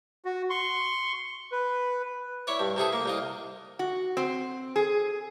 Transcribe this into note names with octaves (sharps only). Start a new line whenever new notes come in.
F#4
C6 C#6
B4
E4 C#5 D5
G2
C3 E4 G#4 A4
A#3
C2 F4 D#5
F#4
C4
G#4